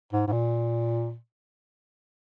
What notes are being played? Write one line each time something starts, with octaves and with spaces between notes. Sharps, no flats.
G#2
G#2
A#2